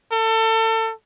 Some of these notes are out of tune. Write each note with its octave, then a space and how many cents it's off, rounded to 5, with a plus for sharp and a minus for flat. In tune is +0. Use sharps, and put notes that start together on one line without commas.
A4 +30